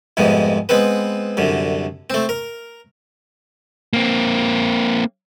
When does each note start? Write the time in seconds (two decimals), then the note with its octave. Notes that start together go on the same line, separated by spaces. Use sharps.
0.17 C2 F2 G#2 C3 B3
0.69 G#3 B3 C4 B4
1.37 C2 F#2 D3
2.10 A3 C4
2.29 A#4
3.93 A#3 C4